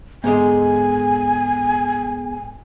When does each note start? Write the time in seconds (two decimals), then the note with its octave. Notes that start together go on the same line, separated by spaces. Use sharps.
0.24 G#2 D3 G#3 B3 G#4 G#5